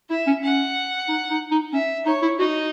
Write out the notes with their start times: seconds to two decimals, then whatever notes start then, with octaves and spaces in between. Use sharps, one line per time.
0.10 E4 E5
0.27 C#4
0.43 C#4 F#5
1.08 D#4
1.30 D#4
1.51 D#4
1.73 C#4 E5
2.06 D#4 C#5
2.22 E4
2.39 D#4 F#4